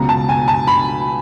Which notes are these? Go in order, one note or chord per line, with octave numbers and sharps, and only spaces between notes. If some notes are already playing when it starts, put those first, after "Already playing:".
Already playing: C#2 B2 F#3 A#5
A5
G#5
A5
B5